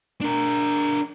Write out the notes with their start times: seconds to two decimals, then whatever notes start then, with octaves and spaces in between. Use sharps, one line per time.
0.21 D4 A#4